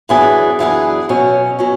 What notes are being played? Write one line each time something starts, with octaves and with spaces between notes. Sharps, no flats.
F#2 E3 B3 D4 G#4
F#2 E3 B3 D4 G#4
B2 F#3 C#4
B2 F#3 C#4